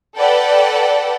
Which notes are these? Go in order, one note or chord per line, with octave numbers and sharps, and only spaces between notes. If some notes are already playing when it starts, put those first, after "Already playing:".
A4 B4 D5 F#5 G5